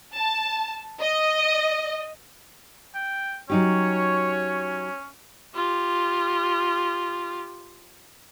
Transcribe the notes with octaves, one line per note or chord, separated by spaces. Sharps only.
A5
D#5
G5
F#3 C#4 D#4 G4 C#5
F4 G4